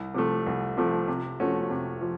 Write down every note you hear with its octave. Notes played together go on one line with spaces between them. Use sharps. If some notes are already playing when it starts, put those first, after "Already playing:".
Already playing: C2
C3 F3 A3
C2
C3 F3 A3
C3
F3 A3 C#4 F#4
C3
F3